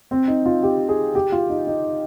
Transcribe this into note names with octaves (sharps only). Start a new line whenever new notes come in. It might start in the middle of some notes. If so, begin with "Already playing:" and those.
C4
D#4
F4
G4
G#4
G4
F4
D#4
D#4